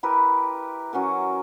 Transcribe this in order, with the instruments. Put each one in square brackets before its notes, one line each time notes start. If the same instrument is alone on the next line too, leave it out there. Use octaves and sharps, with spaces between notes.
[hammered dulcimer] E4 G4 A#4 B4
F#3 C#4 F#4 A#4